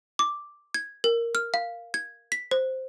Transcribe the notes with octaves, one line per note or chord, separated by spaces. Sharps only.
D6
G#6
A#4
F6
F5
G#6
B6
C5